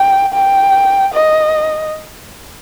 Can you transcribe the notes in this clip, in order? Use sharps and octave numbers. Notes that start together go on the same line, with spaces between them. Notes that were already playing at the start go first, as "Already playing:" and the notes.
Already playing: G5
G5
D#5